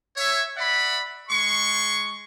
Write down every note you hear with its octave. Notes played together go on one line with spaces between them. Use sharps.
C#5 E5
D5 E5 F#5 B5
G#3 C6 C#6